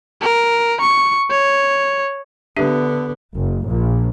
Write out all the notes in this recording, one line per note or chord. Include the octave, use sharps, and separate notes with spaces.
A#4
C#6
C#5
D3 B3 D4 G4 E5
F#1
A#1